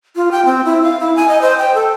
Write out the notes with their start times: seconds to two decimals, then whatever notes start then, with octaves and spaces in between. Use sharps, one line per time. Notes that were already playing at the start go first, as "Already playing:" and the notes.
0.16 F4
0.32 G5
0.46 C4
0.65 E4
0.83 F5
1.00 E4
1.16 G#5
1.28 D#5
1.42 C5
1.58 G5
1.75 A4